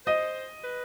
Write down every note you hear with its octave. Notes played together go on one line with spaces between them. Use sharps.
C5 D#5
B4